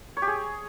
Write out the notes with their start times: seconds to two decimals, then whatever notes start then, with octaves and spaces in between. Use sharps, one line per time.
0.17 C#5
0.22 G4
0.27 G#4